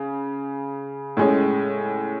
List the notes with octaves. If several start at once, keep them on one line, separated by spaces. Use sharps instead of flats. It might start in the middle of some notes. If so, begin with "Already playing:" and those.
Already playing: C#3
A2 G#3 C#4